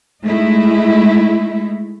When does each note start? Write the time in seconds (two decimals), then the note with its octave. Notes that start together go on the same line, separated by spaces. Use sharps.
0.24 G#3 A3 D#4 E4